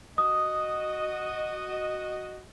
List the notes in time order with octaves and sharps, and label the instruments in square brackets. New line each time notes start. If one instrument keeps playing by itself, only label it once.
[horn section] F#4 D#5 [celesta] D#6